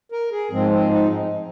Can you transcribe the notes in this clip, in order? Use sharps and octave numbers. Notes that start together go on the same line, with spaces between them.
A#4
G#4
G#2 F3 G#3 C4
C4
D#4